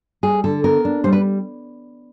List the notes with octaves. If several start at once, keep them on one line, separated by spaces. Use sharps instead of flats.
G3 G#4
D3 A4
B3 A#4
D4
G3 C5
B4